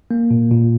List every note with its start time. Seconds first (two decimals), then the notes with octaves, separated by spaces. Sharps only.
0.11 A#3
0.31 A#2
0.51 A#2